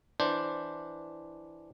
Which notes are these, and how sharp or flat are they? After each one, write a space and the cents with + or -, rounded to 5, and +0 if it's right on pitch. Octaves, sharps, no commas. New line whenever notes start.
E3 +0 D4 +0 C5 +0